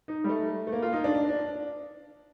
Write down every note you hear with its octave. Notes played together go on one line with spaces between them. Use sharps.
D#4
G3
A3
A3
A#3
F4
D#4
D4
D4
D4